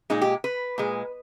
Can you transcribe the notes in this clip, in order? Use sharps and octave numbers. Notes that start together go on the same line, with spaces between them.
A#2 G#3 D#4
G4
B4
A#2 G#3